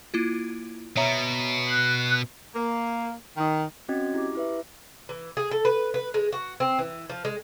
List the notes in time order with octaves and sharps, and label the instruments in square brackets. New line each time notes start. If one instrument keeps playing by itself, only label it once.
[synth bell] A#3 E4 F4
[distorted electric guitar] B2 [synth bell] C#5 E5 A#5
[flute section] F#6 [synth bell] C7 F#7
[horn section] A#3
D#3
[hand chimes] C4 C#4 F#4 D#5 G5 G#6
E4 G4 D6
E4 B4 E5
[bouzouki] E3
G#4
A4
B4
B4
G#3
F#4
C4
E3
F3
G#3